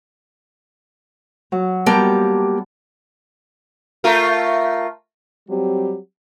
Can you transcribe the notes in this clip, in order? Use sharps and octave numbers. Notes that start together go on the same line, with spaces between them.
F#3
G3 A#3 B3 G4 A5 A#5
A3 F4 A#4
F#3 G3 C4 G4